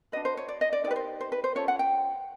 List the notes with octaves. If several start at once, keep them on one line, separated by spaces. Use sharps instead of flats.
D4 F#4 B4 D#5
C5
C#5
D5
D#5
D5
D#4 G4 A#4 B4 D5
C5
C5
B4
C5
C#4 F4 A4 C#5
F#5
G5